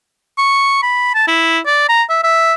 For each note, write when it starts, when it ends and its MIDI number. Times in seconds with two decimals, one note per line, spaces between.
0.38 0.78 85
0.82 1.14 83
1.14 1.23 81
1.27 1.59 64
1.66 1.85 74
1.89 2.03 82
2.09 2.23 76
2.23 2.55 76